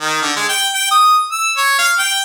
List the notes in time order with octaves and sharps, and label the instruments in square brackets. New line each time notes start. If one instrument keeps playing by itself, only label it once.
[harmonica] D#3
D3
G#3
G5
G5
D#6
E6
C#5
F5
G5